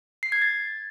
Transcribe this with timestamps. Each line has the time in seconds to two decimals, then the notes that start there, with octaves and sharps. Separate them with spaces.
0.23 C7
0.32 G#6
0.42 A6